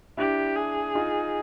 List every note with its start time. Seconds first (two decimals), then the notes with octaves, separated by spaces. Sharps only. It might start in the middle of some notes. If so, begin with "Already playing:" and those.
0.17 D4 E4 G4
0.56 G#4
0.95 D#4 F4